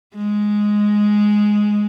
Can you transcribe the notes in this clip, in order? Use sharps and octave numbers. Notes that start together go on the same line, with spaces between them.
G#3